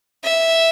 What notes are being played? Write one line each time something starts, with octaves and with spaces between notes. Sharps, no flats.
E5